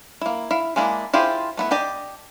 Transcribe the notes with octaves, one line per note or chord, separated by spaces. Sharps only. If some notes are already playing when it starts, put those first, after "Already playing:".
A#3 E4
E4 F5
G#3 A#3 D4 E4
E4 F4 G4 G#4 C5
A3 B3 E4
D4 G4 D5 D#5